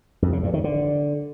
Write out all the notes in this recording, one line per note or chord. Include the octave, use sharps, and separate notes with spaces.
F2
C#3
G2
D#3
D3